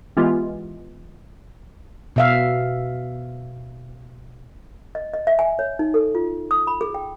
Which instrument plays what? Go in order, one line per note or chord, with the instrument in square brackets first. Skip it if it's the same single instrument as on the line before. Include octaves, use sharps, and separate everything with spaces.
[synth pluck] E3 G#3 B3 F4 G4
[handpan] B2 E5 F5
[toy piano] D#5
D#5
E5
G#5
C#5
D#4
A4
F4
D#6
B5
G#4
G5